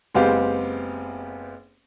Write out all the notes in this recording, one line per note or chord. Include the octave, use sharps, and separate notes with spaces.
F#1 G#3 B3 C4 G4 F5